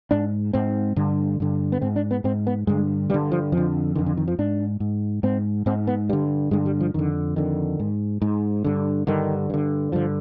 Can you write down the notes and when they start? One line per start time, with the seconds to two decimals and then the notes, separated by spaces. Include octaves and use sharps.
0.11 G#2 D4
0.53 G#2 C4
0.96 G2 D3
1.40 G2 D3
1.72 B3
1.81 G#2 C4
1.96 D4
2.11 B3
2.24 G#2 C4
2.47 B3
2.67 G2 D3 G#3
3.10 G2 D3 G3
3.32 F3
3.52 F2 F3
3.57 D3
3.95 F2 D3 D#3
4.06 D3
4.17 D#3
4.28 F3
4.39 G#2 D4
4.80 G#2
5.23 G#2 C4
5.66 G#2 C4
5.87 B3
6.09 G2 D3 G3
6.51 G2 D3 G#3
6.66 G3
6.81 F3
6.94 F2 D3 D#3
7.36 F2 D3 D#3
7.80 G#2
8.22 G#2
8.64 G2 D3
9.07 G2 D3 D#3
9.50 G2 D3
9.92 G2 D3 F3